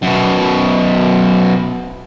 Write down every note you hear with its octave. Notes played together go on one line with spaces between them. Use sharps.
F#2 B2